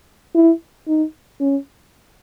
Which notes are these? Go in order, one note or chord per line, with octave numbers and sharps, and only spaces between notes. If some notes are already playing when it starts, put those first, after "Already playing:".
E4
D#4
C#4